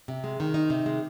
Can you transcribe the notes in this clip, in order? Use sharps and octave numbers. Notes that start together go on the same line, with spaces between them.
C3
G#3
D#3
D#4
C3
G#3